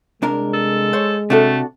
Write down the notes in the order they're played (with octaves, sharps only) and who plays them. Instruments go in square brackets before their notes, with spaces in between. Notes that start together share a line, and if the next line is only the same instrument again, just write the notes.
[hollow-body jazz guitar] C2 D4 A#4 [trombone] G#3
[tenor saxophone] A4
[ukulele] C5 C#5
[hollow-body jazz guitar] C3 [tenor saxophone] A3 [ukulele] D4 F#4 A4